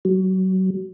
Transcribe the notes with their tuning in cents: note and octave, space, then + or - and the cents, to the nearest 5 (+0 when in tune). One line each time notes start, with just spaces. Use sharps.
F#3 +25